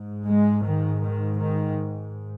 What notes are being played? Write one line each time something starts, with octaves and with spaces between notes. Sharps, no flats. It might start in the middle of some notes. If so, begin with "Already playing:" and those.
Already playing: G#2
G#3
D#3
D#3
D#3